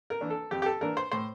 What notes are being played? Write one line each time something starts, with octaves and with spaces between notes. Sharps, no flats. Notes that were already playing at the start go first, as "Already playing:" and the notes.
A#4
E3 A#3 D4
A4
F2 G4
G4
A4
E3 A#3 D4 A#4
C5
A2 C5